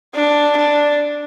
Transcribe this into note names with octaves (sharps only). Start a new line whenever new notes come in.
D4
D4